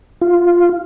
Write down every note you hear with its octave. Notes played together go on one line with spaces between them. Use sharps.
F4